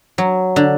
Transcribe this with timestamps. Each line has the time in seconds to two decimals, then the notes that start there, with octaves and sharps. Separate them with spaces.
0.18 F#3
0.56 D3